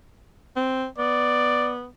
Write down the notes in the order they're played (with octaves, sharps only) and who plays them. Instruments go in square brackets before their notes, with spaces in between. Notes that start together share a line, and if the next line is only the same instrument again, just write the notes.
[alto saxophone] C4
[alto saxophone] B3 [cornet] D5